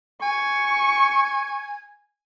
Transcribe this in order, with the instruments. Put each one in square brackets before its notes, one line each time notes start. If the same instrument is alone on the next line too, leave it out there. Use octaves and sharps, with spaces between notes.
[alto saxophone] G#5 [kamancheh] C#6